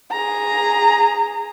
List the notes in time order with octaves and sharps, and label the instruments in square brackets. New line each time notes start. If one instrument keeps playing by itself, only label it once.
[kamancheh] G#4 A#5